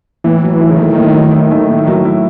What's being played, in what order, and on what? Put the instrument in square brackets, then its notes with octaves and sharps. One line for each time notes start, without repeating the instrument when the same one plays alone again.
[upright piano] A2 [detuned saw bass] E3
[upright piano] F#3
E4
[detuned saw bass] C#3
[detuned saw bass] D#3 [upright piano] A3
[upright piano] A2
F#3
E4
A3
A2
F#3
E4